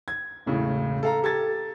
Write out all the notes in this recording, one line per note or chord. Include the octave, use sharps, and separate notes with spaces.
G#6
E1 A2 C#3
A4 F5 A#5
G4 A4 G#6 A6